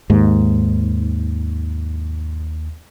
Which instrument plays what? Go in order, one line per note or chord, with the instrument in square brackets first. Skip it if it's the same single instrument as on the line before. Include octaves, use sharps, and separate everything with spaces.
[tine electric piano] D#2 [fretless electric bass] G#2